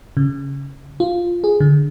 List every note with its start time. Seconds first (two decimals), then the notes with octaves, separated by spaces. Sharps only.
0.17 C#3
1.00 F4
1.44 G#4
1.60 D3